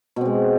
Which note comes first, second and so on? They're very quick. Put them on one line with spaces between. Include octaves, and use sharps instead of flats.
B2 C4 G#3